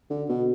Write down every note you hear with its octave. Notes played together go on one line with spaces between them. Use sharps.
D3
B2